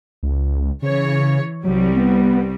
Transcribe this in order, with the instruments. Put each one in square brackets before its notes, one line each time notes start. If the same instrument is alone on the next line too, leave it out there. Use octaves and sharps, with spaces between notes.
[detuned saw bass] C#2
[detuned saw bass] C#3 [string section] E3 C#5
[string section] C2 G3 [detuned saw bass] F#3
[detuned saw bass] B3